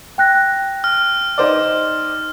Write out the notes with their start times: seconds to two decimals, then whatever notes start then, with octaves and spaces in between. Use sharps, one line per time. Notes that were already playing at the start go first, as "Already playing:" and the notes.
0.18 G5 F#6 A#6
0.84 F6
1.38 D#4 C5 D5